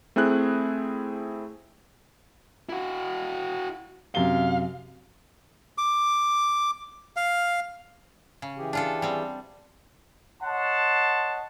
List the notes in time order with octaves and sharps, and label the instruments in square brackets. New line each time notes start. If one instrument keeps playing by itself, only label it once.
[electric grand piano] A3 C4 E4 G#4 F#6
[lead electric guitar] E4 F#4
[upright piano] F#2 C3 G7 [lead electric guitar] F5
[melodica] D6
F5
[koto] C#3
[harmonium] E3 G4 G#4
[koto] D4 F4 A4
G3 C4
[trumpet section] C#5 D#5 F#5 A5 C6